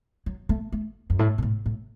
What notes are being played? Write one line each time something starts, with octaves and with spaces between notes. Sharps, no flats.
F#3
A3
A3
F#2
A2
A#2
A2
A2